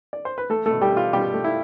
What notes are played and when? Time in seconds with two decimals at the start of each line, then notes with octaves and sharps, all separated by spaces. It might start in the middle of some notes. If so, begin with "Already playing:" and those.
0.13 D5
0.25 C5
0.38 B4
0.50 A3 A4
0.66 B2 A3 A4
0.81 G3 G4
0.92 B2 F4
1.13 B2 G3 G4
1.34 A3
1.44 E4